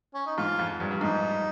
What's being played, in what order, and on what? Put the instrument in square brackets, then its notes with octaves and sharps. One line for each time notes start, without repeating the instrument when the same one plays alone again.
[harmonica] C#4
D#4
[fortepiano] G#2 [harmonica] F4
[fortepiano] F2
G2
G2
[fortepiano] G#2 [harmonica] D#4